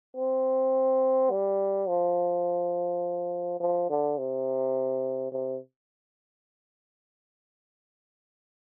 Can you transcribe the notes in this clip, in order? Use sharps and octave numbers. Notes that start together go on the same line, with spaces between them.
C4
G3
F3
F3
D3
C3
C3